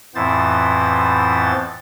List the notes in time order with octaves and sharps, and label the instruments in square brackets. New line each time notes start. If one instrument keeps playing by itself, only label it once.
[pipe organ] F2 A2 E3 B3 C5 A6